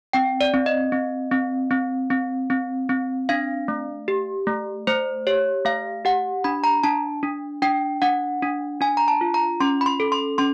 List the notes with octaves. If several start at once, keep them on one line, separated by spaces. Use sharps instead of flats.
C4 G5
D5
C4
D#5
C4
C4
C4
C4
C4
C4
D4 F5
A3
G4
A3
A3 C5
G4 C#5
A3 F5
G4 F#5
D4 B5
A#5
D4 A5
D4
D4 G5
D4 F#5
D4
D4 G#5
A#5
A5
F4
A#5
C#4 C6
B5
C6
A4
C6
C#4 C6